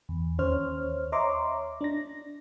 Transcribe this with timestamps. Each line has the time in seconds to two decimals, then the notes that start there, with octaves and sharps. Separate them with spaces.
0.09 E2
0.39 D#2 C#4 C5 C#5 F6
1.12 C#5 D#5 E5 A#5 C6 D6
1.81 D4 A#6